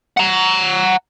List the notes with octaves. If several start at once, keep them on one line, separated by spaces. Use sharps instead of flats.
F#5 A#5